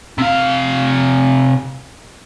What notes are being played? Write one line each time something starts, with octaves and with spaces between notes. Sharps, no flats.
C3 F5